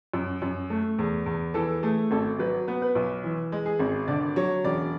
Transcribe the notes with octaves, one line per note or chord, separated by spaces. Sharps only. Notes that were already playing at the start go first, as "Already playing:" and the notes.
F#2
F#2
A3
E2
E2
E3 A4
A3 G#4
G#1 A4
F#3 B4
B3
B4
B1
E3
G#3
G#4
G#1
D3 D5
F#3 C#5
E1 D5